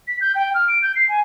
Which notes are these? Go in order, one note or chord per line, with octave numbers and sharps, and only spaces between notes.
B6
G6
G5
F6
D7
G6
C7
G#5